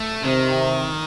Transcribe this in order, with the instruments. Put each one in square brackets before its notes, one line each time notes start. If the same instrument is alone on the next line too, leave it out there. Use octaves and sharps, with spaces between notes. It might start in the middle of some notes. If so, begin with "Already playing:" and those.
Already playing: [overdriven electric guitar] A3
[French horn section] C3 [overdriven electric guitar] D#3